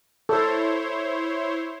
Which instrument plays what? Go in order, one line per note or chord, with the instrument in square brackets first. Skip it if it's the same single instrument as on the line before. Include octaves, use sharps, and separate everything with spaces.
[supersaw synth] E4 C5 C#5 [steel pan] A4